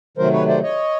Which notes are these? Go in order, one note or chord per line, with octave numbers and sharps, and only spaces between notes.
C3 D#3 F#3 A3 A#4 C5
B4 C#5
C5 D5
C#5 D#5